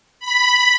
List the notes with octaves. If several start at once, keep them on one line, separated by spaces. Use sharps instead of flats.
B5